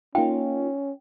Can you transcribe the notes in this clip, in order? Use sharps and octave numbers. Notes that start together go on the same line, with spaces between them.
A#3 C#4 D#4 F4 G5